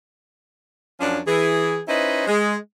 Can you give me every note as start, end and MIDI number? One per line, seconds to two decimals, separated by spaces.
1.00 1.20 42
1.00 1.20 53
1.00 1.20 61
1.00 1.20 62
1.27 1.81 52
1.27 1.81 68
1.88 2.27 61
1.88 2.27 63
1.88 2.27 64
1.88 2.27 71
1.88 2.27 72
1.88 2.27 75
2.27 2.56 56